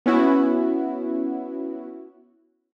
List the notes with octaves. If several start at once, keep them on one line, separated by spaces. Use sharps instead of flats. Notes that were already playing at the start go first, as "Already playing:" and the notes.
B3 C#4 E4 F#4